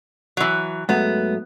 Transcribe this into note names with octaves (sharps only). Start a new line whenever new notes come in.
E3 F#3
G#2 F#3 A3 B3